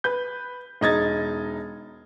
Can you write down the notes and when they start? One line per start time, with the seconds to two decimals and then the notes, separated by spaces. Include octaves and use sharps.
0.04 B4 G6
0.81 E1 D#4 G#6 A6